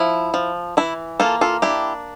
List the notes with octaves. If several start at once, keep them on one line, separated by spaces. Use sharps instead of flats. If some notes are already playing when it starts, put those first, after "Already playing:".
Already playing: F3 E4
F3
E3 E4
A#3 F4 A4
F4 A4
D4 E4 G4